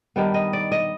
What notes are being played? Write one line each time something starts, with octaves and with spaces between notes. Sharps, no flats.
G2 D#3 G3 B3
D#5
D5
D#5